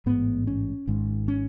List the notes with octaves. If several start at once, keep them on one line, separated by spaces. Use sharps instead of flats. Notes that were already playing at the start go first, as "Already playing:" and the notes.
A1 G#2 B3
C#4
G#1 G#2
C#4